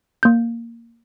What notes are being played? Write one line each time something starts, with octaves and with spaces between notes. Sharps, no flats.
A#3 G6